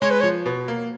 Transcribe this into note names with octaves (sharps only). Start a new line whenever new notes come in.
G#3 C#5
B4
C#5
F3
B2
A#3